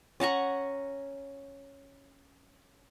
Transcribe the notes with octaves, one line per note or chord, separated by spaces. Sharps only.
C#4 F#5 A#5 C#6